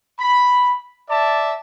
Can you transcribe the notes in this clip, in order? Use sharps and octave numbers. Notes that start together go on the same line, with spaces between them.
B5
D5 E5 A5